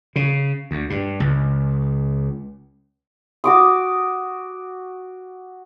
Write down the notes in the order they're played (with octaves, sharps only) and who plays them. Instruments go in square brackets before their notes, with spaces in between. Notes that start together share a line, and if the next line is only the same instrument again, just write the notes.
[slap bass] C#3
D2
G2
C#2
[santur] F#4 D6 D#6